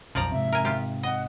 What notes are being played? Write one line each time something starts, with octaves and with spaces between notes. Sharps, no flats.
B1 F2 F3 D5 A#5
G#2 C3 E5
A#4 G#5
F4 G4
D#5 F#5